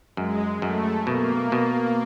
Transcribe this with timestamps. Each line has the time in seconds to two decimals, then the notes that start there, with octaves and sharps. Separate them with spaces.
0.17 F#2 G#3
0.62 F#2 A3
1.07 B2 A#3
1.52 B2